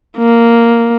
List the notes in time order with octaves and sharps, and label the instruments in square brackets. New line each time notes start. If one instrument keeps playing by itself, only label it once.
[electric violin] A#3